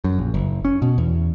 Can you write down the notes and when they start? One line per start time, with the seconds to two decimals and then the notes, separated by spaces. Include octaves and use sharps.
0.04 F#2
0.18 A#1
0.34 F#1
0.65 C#4
0.82 B2
0.98 E2